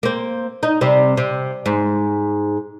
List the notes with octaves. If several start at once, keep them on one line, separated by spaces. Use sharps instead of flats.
A#3 C4
D#4
C3 G3 C4
C3
G#2